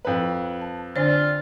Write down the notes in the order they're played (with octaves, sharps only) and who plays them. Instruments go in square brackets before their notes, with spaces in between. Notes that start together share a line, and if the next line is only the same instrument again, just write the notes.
[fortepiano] F2 B4
[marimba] A5
[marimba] D3 D4 G#5 [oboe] F4 [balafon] C5 D5